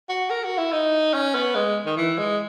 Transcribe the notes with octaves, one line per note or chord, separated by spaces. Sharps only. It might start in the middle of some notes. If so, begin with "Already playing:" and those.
F#4
A#4
F#4
E4
D#4
C#4
B3
G#3
D#3
E3
G#3